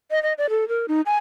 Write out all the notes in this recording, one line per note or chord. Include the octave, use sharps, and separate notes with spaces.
D#5
D#5
D5
A4
A#4
D#4
G#5